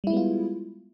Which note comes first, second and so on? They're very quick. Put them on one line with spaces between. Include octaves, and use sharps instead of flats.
G3 E4 G#3 B3 F4